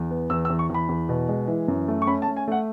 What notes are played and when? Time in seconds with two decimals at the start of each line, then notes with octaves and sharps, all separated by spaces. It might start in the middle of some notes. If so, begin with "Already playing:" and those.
Already playing: E2
0.11 B3
0.30 E2 E6
0.45 E6
0.50 E2
0.59 C#6
0.70 E2 B5
0.89 E2
1.09 B2
1.29 G#3
1.48 E3
1.68 F#2
1.88 A3
2.02 C#6
2.07 C#4 B5
2.22 A5
2.28 A3
2.37 G#5
2.48 A3 F#5